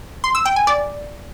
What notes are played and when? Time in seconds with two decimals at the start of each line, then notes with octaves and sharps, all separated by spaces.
0.24 C6
0.35 E6
0.45 G5
0.56 G#5
0.67 D5